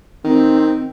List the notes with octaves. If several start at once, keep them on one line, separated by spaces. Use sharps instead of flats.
D#3 C4